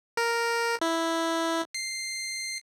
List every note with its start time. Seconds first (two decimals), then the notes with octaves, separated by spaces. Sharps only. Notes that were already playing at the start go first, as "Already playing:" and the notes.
0.17 A#4
0.81 E4
1.74 C7